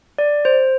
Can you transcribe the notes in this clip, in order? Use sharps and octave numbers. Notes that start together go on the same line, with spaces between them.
D5
C5